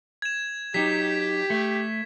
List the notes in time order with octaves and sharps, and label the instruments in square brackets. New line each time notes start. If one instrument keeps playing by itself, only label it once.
[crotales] G#6 E7
[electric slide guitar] F#3 D#4 [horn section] G4 [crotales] B6
[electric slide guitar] A3